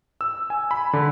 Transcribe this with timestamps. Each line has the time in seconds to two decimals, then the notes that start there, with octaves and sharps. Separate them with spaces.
0.21 E6
0.50 G#5
0.71 B5
0.93 D3